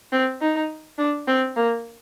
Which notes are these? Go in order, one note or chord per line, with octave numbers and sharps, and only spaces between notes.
C4
D#4
D4
C4
A#3